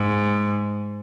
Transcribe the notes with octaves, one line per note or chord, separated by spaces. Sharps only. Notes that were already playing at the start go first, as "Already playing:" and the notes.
Already playing: G#2